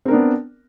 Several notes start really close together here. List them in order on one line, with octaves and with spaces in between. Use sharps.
C4 A#4 D4 B3